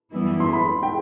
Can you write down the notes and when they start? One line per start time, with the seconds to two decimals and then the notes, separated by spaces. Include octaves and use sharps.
0.12 F#2 E3 G3 B3 E4
0.40 C6
0.53 B5
0.83 G5